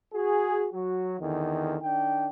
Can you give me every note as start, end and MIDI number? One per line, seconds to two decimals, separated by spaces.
0.13 0.67 66
0.13 0.67 68
0.73 1.18 54
0.73 1.18 66
1.20 1.76 40
1.20 1.76 50
1.20 1.76 51
1.82 2.30 51
1.82 2.30 62
1.82 2.30 79